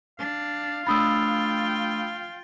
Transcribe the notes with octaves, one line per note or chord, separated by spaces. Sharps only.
D4 F5
A3 D4 F4 G5 B5 D#6 E6 A6